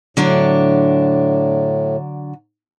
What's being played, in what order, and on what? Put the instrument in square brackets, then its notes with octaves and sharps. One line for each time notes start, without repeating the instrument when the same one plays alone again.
[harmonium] A2 [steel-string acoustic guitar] D3 F#3 D4